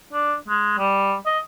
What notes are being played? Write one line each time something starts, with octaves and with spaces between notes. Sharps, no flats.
D4
G#3
G3
D#5